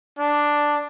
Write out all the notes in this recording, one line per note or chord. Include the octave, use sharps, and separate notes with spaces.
D4